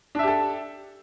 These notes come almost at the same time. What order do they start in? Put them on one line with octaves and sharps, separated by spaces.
D4 E5 G4 A4